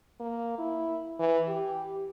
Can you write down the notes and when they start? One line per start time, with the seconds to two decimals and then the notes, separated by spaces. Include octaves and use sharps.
0.20 A#3
0.58 E4
1.19 E3
1.48 G4